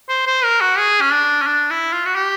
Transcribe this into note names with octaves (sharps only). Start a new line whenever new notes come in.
C5
C5
A#4
F#4
G#4
C#4
D4
C#4
D4
E4
F4
F#4
G4